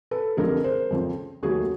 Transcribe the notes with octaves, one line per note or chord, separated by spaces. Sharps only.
A4 B4
F1 F2 D3 F3 G#3 G#4 A#4
A#4 C5
F2 C#3 F3
D#2 C#3 F#3 A3 F#4 G#4